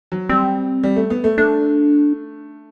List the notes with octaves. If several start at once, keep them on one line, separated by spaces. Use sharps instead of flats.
F#3
G3 C4
G3
A3
B3
A3
A3 D4